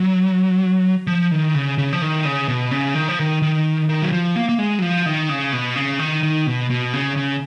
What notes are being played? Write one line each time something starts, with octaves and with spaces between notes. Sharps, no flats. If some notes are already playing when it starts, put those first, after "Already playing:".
Already playing: F#3
F3
D#3
C#3
C#3
F3
D#3
C#3
B2
C#3
D#3
F3
D#3
D#3
D#3
F#3
F3
A#3
A#3
G#3
F#3
F3
D#3
C#3
B2
C#3
D#3
D#3
B2
B2
C#3
C#3